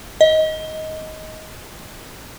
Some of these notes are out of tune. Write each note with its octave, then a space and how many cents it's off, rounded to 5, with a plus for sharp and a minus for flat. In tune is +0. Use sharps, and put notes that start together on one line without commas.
D#5 +15